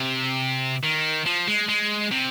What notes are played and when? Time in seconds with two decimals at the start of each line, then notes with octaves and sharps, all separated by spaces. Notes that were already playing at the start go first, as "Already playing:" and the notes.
Already playing: C3
0.84 D#3
1.26 F3
1.47 G#3
1.68 G#3
2.11 C3